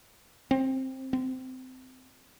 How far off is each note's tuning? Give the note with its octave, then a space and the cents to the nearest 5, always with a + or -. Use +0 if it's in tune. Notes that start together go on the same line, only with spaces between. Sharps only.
C4 +15
C4 -20